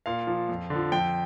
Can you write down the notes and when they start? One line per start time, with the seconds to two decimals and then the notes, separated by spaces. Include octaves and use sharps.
0.06 A#2 F5
0.27 F3
0.49 F2
0.70 D3
0.75 F3
0.92 F2 G5